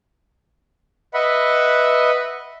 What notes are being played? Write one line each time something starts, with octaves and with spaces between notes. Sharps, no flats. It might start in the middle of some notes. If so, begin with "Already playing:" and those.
B4 D#5 E5 F#5 B5